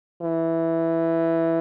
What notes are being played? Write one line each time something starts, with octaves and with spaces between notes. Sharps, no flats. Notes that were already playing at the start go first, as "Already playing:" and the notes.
E3